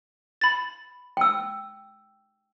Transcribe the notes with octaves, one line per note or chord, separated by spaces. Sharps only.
B5 A6
G5 E6